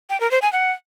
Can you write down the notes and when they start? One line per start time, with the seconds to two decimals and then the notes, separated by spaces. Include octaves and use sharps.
0.10 G5
0.20 A#4
0.31 C5
0.42 G#5
0.53 F#5